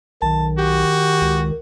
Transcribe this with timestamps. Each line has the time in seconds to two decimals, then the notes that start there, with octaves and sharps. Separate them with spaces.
0.22 B1 D#3 A5
0.59 F#4 G4
1.21 C#2